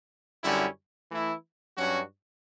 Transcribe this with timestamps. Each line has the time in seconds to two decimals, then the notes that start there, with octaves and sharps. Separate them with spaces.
0.43 F#2 D3 G3 C#4 E4
1.10 E3 A3 E4
1.78 G2 F#3 C#4 F#4